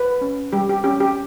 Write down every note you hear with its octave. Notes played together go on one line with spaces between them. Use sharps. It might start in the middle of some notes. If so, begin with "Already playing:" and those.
Already playing: B4
C#4
G3 G4
G4
C#4 G4
G4